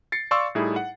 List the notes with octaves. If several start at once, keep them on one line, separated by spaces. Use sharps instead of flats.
A6 C7 C#7
D5 F5 C6 C#6 E6
A2 G3 D#4 E4 G#4
F#5